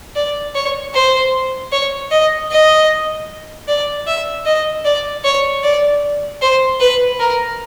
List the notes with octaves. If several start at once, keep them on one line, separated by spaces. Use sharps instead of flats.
D5
C#5
C5
C#5
D#5
D#5
D5
E5
D#5
D5
C#5
D5
C5
B4
A#4